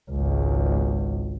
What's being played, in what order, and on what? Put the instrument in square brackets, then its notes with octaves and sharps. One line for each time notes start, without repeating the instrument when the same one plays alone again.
[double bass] G#1 C#2